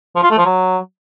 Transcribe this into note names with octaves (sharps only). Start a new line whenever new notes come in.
F3
F4
A3
F3
F#3